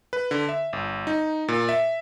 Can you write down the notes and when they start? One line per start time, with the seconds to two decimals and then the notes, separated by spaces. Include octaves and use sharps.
0.13 B4
0.31 D3
0.49 E5
0.73 G1
1.07 D#4
1.48 A#2
1.69 E5